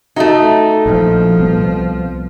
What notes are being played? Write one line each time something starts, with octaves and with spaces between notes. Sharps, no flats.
A3 D#4 F#4 D#5
A#1 F3
C2 B3